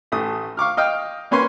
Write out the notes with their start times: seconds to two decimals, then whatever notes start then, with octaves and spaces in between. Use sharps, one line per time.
0.12 A1 A3 D#6
0.57 F5 C#6 D6 F6
0.77 D#5 F5 G5
1.31 A#3 C#4 B4 G#5 C6